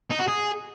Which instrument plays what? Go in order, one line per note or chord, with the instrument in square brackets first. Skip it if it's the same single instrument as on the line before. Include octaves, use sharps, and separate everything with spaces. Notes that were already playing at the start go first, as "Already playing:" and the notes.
[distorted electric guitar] D#4
F#4
G#4